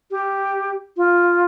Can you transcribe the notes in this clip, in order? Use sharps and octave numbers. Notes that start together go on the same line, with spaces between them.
G4
F4